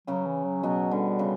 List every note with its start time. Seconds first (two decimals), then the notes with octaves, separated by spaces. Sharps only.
0.07 C#3 F#3 C#4
0.26 E3
0.45 F#3
0.63 B2 F#3 B3
0.91 D3 G3
1.19 C#3